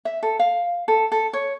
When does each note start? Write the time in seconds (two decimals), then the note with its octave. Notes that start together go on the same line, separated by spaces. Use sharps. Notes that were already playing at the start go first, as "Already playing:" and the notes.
0.05 E5
0.23 A4
0.39 F5
0.88 A4
1.12 A4
1.33 C#5